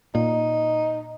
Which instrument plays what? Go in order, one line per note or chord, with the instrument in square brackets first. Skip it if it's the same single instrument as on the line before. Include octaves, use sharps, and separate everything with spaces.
[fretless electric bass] A#2 [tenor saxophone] D#4